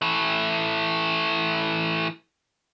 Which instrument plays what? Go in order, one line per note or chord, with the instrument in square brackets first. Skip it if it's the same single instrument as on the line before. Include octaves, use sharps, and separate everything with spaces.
[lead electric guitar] E3 A3